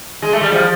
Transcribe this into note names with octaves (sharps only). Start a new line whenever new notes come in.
G#3
A3
G3
F3